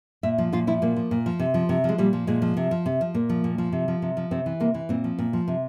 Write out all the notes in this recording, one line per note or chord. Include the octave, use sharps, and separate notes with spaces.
A#2 E5
F3 F4
A#2 F4
F3 E4
A#2 A#3
F3
A#2
F3
C3
F3
C3
F3 G#3
A#2 G3
F3
A#2 G#3
F3
C3
F3
C3
F3
A#2 A#3
F3
A#2
F3
C3
F3
C3
F3
C3 C4
E3
C3 A#3
E3
A#2 C4
F3
A#2
F3
C3